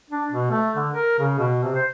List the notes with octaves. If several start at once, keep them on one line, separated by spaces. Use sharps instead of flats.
D4
B2
A3
D3
A#4
C#3
B2
C3
C5